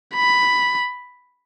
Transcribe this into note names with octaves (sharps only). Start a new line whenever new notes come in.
B5